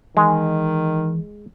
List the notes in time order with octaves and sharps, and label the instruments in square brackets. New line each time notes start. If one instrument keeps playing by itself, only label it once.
[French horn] D#3 [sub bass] E3 [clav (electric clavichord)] G#3